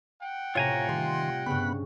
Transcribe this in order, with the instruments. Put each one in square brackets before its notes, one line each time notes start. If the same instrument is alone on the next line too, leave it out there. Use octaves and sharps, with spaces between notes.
[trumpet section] F#5 G5
[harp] A2 C3 [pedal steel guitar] F4 G#5 A#5 [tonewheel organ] C#5
[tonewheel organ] D#3 C6 [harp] G3
[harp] G2 C#3 [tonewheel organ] B3 B5 F#6